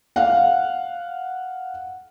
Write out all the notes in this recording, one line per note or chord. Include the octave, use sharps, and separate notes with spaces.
F5 F#5